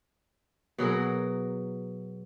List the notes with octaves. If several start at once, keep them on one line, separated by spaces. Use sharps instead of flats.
B2 F#3 G#4 A#4